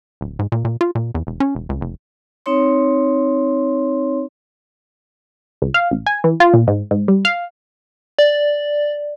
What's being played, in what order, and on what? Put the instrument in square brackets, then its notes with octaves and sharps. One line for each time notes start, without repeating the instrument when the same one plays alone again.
[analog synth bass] D1
G#2
A#2
A#2
F4
A#2
E2
E1
C#4
E1
C#2
F1
[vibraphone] C4 D#4 C#5 C6
[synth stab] C#2
F5
A1
G#5
E3
F4
A#2
G#2
G#2
G3
F5
[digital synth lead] D5